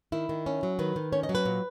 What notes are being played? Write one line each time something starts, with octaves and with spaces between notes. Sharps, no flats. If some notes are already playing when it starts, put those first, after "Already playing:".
D#3 E4
D#3
C#4
F#3
D#3 B4
D#3
C#4 C#5
D#5
F#3
B4
A#2